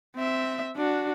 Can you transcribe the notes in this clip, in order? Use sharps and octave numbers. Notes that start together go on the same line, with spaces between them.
C4 E5
D4 F#4